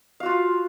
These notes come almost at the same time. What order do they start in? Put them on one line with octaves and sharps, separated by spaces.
F5 F#4 F4